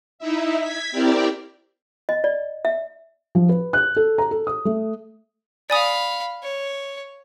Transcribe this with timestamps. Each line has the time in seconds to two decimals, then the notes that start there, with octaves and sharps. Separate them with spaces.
0.19 D#4 E4 E5
0.60 G#6 B6
0.92 C4 E4 G4 A#4 D5 G5
2.09 D#5
2.24 D5
2.65 E5
3.35 F3
3.49 B4
3.73 F#6
3.96 A4
4.18 A#5
4.31 A4
4.47 D#6
4.65 A3
5.70 D5 F5 G#5 B5 D#6
6.43 C#5